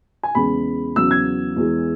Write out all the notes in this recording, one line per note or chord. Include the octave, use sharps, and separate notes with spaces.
G#5
E2 C#3 G#3 B5
E2 C#3 F#3 E6
G#6
E2 E3 G#3